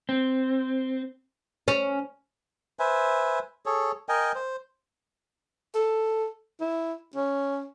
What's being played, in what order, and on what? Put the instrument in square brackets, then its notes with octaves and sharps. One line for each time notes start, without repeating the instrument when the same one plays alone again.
[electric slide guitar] C4
[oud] C#4
[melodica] B4 C5 E5 G#5
G#4 A4 C#5
A#4 D#5 G5 G#5
C5
[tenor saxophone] A4
E4
C#4